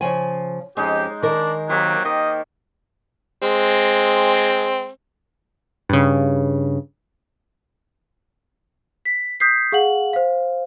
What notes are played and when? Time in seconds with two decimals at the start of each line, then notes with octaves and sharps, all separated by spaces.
0.01 C#3 F3 G#5
0.77 F2 G#3 C#4 D#4 G4
1.23 D#3 D4 A#4
1.69 F#3 A#3 G4 C5
2.05 D#3 D#5
3.42 G#3 C4
5.89 G2 C#3
9.05 B6
9.40 D#6 G6 B6 C7
9.72 G#4 F5 F#5 F#7
10.13 C5 F5